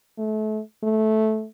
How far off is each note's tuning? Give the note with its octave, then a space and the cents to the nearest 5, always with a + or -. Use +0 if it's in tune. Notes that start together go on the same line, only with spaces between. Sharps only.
A3 -30
A3 -15